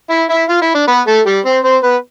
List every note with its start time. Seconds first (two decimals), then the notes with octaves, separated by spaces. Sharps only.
0.10 E4 E5
0.29 E4 E5
0.49 F4 F5
0.62 E4 E5
0.74 D4 D5
0.87 B3 B4
1.07 A3 A4
1.26 G3 G4
1.45 C4 C5
1.64 C4 C5
1.83 B3 B4